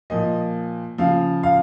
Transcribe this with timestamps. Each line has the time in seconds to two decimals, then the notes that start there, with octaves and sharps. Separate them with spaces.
0.10 A#2 F3 D#5
0.98 C#3 F3 F5
1.43 F5